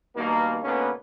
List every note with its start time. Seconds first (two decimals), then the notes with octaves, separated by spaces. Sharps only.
0.16 G2 B2 D#3 A#3
0.63 G#2 B2 D3 A#3 B3 C#4